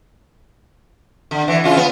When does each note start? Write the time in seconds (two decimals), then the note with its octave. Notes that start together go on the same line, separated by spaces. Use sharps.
1.31 D3
1.48 E3
1.64 C#3 F4
1.77 B3